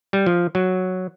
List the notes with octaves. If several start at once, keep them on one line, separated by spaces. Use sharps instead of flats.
G3
F3
F#3